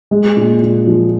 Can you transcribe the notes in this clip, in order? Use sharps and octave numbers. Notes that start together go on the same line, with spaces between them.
G#3
A#2
A#2
F3